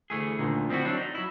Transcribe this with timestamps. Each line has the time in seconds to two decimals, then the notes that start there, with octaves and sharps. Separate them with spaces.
0.10 D2 E3 A3 G#4
0.39 D2 A#2 D3 D#3
0.69 F3 C4 D4 E4 F#4
0.85 F#3 C4 D4
0.98 D#4
1.15 F#3 E4